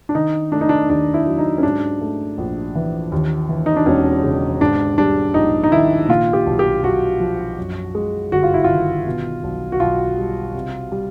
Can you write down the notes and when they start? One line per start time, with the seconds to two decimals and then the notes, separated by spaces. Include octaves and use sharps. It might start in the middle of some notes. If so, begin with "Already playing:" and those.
0.09 D4
0.15 D#3 D#4
0.52 A3 D4
0.61 D#4
0.69 D4
0.89 D#2 D4
1.14 E4
1.27 F#3
1.39 D#4
1.58 C#4
1.63 G#2 D4
2.01 A3
2.38 A#1
2.75 E3
3.12 D#2
3.49 E3
3.66 D#4
3.76 D4
3.86 E1 C#4
4.23 C#3
4.60 G#2 D4
4.98 G3 D4
5.34 A#1 D#4
5.64 D#4
5.72 D#3 E4
6.08 A#2 F4
6.33 G4
6.46 B1
6.59 G4
6.83 B1 F#4
7.20 F3
7.58 F#2
7.95 G#3
8.32 G1 F#4
8.43 F4
8.54 E4
8.64 F4
8.70 D#3
9.06 B2
9.44 B1
9.72 F#4
9.80 B1 F4
10.18 G3
10.54 C3
10.92 G3